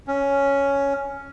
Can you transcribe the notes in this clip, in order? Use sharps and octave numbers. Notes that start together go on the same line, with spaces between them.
C#4